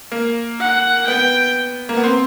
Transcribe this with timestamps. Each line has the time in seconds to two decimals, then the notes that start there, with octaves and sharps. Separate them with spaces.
0.12 A#3
0.60 F#5
1.07 B3 G5
1.89 A#3
1.97 B3
2.04 C4